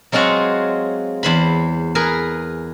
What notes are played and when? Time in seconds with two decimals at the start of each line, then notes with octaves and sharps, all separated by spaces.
0.12 F#3 G#3 C4 F4 F#4 C#5
1.23 E2 C5 B5
1.95 G#4 A#4 B4